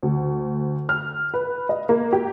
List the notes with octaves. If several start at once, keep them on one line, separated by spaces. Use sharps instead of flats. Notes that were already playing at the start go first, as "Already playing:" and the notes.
D2
F6
B4
D#5
A#3
G4